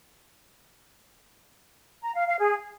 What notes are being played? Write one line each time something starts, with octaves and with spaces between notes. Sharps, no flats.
A#5
F5
F5
G#4